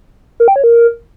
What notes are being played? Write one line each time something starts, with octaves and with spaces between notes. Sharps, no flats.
A#4
G5
C#5
A#4